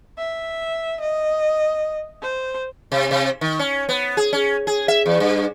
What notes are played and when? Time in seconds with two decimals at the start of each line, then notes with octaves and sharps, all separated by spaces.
0.18 E5
1.00 D#5
2.22 C5
2.92 C3
3.11 C3
3.41 D#3
3.59 C#4
3.89 B3
4.17 G#4
4.33 C#4
4.67 G#4
4.88 E5
5.06 E2
5.20 G2